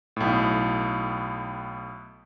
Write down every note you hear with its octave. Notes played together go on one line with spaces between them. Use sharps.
B1 A2